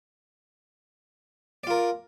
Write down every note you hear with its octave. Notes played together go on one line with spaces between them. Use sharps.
F4 A#4 D5